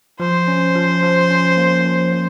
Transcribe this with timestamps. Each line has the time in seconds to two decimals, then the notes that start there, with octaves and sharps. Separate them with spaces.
0.20 F3 C5
0.48 C#4
0.75 F3
1.03 F3
1.30 C#4
1.57 A#3
1.86 F3
2.12 F3